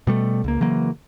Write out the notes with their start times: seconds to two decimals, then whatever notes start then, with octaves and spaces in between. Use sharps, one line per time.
0.07 B2 G3 A3
0.44 C#2 A#3
0.60 C#3 E3 F#3 A#3